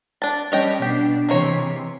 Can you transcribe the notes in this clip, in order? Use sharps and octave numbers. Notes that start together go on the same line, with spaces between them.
D4 A5
G3 C#4 C#5 D#5 G5
B2 D4 G4
C3 E3 G#3 A#3 C#5